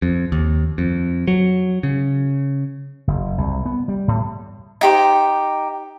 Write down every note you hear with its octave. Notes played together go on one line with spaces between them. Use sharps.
F2
D#2
F2
F#3
C#3
F#1
C2
B3
G3
A2
D#4 G4 C5